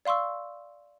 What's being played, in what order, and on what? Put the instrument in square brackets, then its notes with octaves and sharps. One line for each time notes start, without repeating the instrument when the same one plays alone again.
[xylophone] D5 F5 C6 C#6 E6